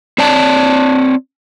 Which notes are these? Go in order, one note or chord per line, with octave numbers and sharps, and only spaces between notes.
C4 C#5 D5 A5